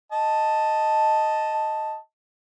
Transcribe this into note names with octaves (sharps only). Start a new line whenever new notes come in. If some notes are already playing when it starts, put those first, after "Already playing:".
D#5 A5